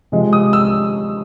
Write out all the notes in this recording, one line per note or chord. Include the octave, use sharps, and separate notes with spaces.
C3 F3 G#3
D#6
E6